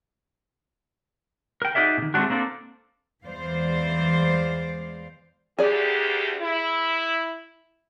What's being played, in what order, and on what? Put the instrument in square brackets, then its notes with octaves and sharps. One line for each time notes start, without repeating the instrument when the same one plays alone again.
[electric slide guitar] A#4 G5
D#4 F#4 G#4 D5 E5
B2 D#3
G#3 A3 C4 D4 F#4
A#3 C4 D4 A4 D5
[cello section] E2 E3 G#3 C5 D5 F5
[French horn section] D2 G4 [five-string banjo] G#4 D5
[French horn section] E4